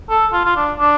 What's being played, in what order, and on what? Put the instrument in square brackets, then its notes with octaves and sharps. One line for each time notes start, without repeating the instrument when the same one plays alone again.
[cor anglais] A4
F4
F4
D4
D4